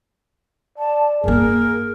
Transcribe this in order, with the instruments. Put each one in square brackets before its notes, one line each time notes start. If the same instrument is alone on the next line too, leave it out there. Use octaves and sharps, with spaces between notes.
[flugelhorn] D5 [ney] A5
[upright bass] G2 A#3 [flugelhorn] G#4 [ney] A#4